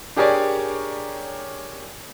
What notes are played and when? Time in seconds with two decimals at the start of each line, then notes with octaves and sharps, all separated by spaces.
0.16 D4 G4 G#4 A#4 C#5 D5